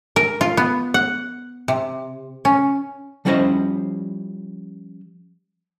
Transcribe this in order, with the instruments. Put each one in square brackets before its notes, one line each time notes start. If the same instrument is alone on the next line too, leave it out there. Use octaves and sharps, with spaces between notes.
[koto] A#4
F4
B3
F#5
C3
C#4
[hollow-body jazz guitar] F3 G3 C#4 E4 C5 D#5